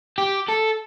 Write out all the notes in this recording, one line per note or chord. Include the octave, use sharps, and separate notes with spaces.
G4
A4